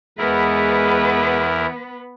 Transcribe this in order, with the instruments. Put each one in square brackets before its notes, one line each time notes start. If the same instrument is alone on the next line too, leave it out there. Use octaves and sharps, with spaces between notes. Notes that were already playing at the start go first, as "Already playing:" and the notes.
[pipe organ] E2 E4 A#4 [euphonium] G#3 [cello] B3 B4